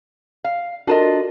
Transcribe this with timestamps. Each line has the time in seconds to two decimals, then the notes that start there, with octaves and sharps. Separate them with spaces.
0.44 F5
0.87 D4 F4 F#4 A4 A#4 D#5